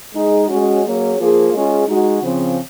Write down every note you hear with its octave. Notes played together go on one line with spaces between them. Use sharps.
G#3 D#4 G#4
G#3 C#4 F#4
F#3 A#3 C#4 G#4
F3 A#3 F4 G#4
G#3 C#4 F4 G#4
G#3 D#4 F#4
C#3 F3 C4